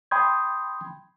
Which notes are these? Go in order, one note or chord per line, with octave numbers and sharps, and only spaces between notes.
G5 B5 C6 D#6 G6 G#6